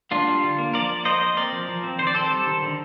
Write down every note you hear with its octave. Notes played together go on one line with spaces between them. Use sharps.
A#3 D4 F4
G3
D3
A#3
F3 A#4 D5
A#3
A#3 C5 D#5
A#3
C4 A#4 D5
F3
F3
C4
D#3 C5
D5
C4 A4 C5
G3
D#3
D3